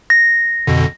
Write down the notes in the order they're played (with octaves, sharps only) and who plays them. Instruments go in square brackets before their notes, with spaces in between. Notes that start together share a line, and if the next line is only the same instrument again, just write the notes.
[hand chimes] A#6
[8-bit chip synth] F2 B2 D3